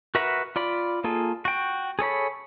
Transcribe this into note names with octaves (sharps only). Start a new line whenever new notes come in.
F#4 A#4 B4 E5 F#5
F4 D5 B5
A#3 F4 G#4 A4
F#4 G5
G#4 A4 C#5 B5